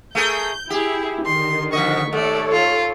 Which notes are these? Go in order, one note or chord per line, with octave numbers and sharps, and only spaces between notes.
A3 G#4 A#4 G6
E4 G4 G#4
D3 D#3 C6
F2 B2 D#5 C#6 B6
D#2 A3 A4 C#5 D5
F4